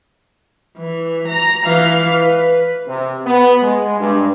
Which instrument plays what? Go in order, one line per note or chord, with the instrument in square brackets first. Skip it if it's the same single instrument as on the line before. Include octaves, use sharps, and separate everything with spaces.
[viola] E3
A#5
E3 F5
B4
[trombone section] C3
B3
G#3
G2